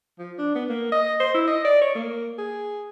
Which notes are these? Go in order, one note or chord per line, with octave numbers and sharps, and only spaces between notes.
F3
D4
B3
A#3
D#5
C5
E4
D#5
D5
C#5
A#3
G#4